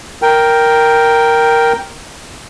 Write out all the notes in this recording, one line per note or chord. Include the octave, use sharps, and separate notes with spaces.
A#4 G5